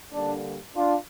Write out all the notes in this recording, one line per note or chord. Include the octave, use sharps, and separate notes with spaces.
D3 G3 A#3 D4
D4 F4